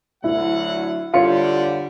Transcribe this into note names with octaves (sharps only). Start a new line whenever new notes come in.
D2 F#3 E4 F#5
D3 G3 F4 C#5 F5 C#7